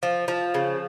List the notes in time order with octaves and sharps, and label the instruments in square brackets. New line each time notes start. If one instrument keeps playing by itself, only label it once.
[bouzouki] F3
F3
C#3